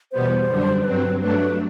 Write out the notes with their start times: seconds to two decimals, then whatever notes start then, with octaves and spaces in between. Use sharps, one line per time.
0.12 E2 B2 G3 B3 C5
0.48 F#2 D3 G3 D4
0.84 G2 F#3 C4 B4
1.21 G2 F#3 A3 D4 B4